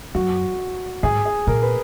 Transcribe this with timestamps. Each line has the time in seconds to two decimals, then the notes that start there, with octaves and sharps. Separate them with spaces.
0.15 F#2 F#4
1.03 G#2 G#4
1.25 G#4
1.47 A#2 A#4
1.62 B4